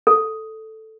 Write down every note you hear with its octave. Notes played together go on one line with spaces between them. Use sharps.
A4